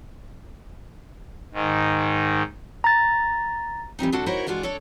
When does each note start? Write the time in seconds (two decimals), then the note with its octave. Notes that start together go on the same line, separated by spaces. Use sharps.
1.54 G#2 D#3
2.84 A#5 A6
3.99 E3 G3 C4 D#4
4.12 D2 D4 F#4 A4 C5
4.26 D#4 E4 F#4 A#4 C5 C#5
4.47 E3 G#3 D4 F4 F#4
4.63 D4 A4 C#5